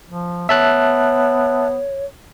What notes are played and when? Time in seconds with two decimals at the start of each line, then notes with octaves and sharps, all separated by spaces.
0.08 F3
0.49 B3 C#5 E5 A5 F#6